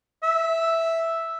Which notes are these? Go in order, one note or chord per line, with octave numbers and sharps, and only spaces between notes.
E5